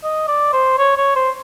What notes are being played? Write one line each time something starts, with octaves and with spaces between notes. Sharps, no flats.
D#5
D5
C5
C#5
C#5
C5